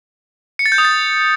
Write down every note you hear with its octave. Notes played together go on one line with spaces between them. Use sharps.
C#7
A6
G6
D#6
A6